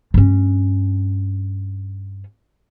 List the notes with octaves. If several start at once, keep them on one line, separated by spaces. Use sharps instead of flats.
G2 C#4